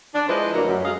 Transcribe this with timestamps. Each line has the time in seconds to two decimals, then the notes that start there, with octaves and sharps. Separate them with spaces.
0.14 D4
0.28 F3 G#3 E4 B4 C5 D#5
0.53 D2 F3 F#3 A#3 D4 A#4
0.67 F#2
0.83 F#3 G#3 A3 D#5 F5